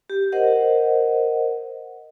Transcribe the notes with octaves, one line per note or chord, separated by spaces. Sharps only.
G4
A#4 C5 D#5 F#5